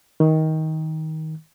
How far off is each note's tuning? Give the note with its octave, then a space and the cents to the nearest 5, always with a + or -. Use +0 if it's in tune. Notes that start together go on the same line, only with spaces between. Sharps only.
D#3 +20